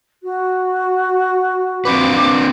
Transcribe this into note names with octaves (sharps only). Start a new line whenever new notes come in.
F#4
C4 D4 B4 D6